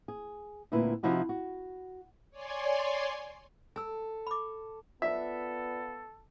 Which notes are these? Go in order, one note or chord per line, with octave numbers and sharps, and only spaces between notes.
G#4
D2 A#2 C4 E4 B4
C3 F3 D#4 E4 F#4 G4
F#4
C#5 D5 G#5 C6
A4 G#5 E6
B5 D6
B3 F4 A4 D5 E5 F5